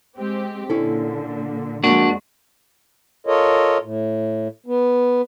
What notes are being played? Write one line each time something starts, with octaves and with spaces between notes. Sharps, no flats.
G#3 C4 G4
A#2 D3 C#4 E4 A4
F2 G#3 A#3 D4 F#4
F4 A4 A#4 C#5 D#5
A2
B3